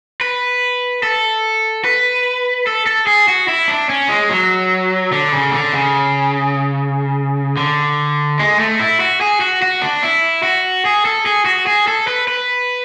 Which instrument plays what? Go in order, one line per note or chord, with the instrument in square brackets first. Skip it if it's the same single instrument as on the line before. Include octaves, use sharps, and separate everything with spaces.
[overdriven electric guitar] B4
A4
B4
A4
A4
G#4
F#4
E4
D4
C#4
G#3
F#3
D3
C#3
D3
C#3
D3
G#3
A3
E4
F#4
G#4
F#4
F#4
D4
E4
F#4
G#4
A4
G#4
F#4
G#4
A4
B4
B4